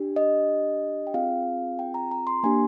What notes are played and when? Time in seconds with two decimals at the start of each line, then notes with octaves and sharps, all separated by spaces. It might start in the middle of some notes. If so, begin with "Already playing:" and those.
Already playing: D4 G4
0.16 D#5
1.07 G5
1.14 C4 F4 G#4 F5
1.79 G5
1.94 A#5
2.11 A#5
2.27 C6
2.43 A#3 D4 G4 G#5